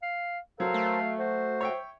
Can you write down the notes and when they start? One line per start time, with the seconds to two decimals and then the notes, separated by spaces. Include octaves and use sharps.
0.02 F5
0.60 F#3 A4 A#4 C5 F5
0.74 A3
1.19 F#4 C5
1.61 C#5 E5 G5